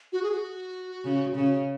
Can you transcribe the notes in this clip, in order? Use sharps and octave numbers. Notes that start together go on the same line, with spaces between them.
F#4
G#4
F#4
C#3
C#3